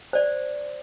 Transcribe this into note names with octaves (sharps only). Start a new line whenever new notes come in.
C5 D5